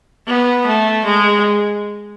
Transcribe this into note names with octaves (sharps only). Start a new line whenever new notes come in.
B3
A3
G#3